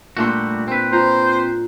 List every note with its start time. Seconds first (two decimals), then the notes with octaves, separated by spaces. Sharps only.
0.17 A#2 G3 A3 D4 F#4 C6
0.68 C4 B4
0.92 F4 C5 A#5